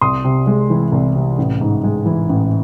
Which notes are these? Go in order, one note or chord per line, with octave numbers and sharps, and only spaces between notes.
C2 C6 D#6
C3
G#3
E3
C2
C3
A1
G#2
G#3
E3
A1